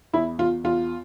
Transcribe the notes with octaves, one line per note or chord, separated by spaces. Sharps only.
E2 E4
E2 F4
E2 F4